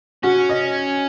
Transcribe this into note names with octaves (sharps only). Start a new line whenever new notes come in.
C#4 F#4
D#5